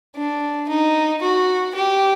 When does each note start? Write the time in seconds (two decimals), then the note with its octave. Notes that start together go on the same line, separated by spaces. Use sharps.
0.16 D4
0.68 D#4
1.22 F#4
1.75 G4